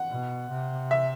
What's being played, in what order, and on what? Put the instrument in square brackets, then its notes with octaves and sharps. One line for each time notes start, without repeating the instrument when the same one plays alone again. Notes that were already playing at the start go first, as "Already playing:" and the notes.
Already playing: [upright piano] F#5
[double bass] B2
C3
[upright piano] E5